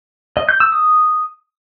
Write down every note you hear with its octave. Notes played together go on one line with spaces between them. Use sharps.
D#5
G6
E6
D#6